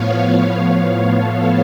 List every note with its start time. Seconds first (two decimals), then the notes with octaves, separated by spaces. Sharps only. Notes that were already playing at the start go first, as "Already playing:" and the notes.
Already playing: A2 F3 B3 C#5 F5
1.05 A4 C#5